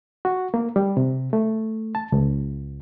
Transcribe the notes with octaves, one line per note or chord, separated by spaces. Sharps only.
F#4
A#3
G3
C3
A3
A5
C#2